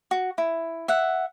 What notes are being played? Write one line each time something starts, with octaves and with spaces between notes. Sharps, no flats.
F#4
E4
E5 F#5